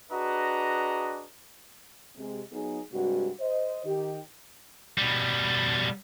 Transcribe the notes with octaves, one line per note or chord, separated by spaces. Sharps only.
D4 F#4 G#4 B4 D#5 A#5
C3 G#3
F#3 B3 D#4 G#4
G2 C3 G#3 F#4
C5 D#5
D#3 G4
B2 G3